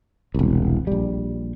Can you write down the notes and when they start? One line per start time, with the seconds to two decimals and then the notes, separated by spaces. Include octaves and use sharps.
0.34 E1 C2
0.87 A#1 G3